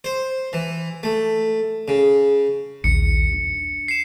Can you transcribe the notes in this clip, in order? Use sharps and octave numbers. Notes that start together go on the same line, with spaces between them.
C5
E3
A3
C#3
A#1 D#2 C#7
D4
C7 E7